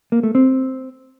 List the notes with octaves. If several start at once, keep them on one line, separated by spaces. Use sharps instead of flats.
A#3
A3
C4